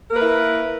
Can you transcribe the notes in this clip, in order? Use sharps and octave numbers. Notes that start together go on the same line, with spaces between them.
A#3 E4 A#4 B4